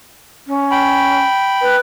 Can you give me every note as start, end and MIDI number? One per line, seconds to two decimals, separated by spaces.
0.47 1.21 61
0.71 1.76 79
0.71 1.76 83
1.62 1.78 71